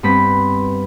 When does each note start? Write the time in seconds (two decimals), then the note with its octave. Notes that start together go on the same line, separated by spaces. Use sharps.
0.03 G2 B3 C4 B6